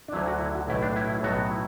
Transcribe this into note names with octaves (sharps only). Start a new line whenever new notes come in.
D4
D2 D3 F#3 E4
F#4
E4
F#4
B1 A2 A3 E4
D4
E4
E4
B1 A2 F#3 B3 F#4
E4